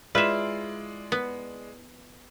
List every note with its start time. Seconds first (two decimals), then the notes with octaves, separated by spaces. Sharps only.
0.15 G#3 E4 F4 B4 D5 E5
1.12 B3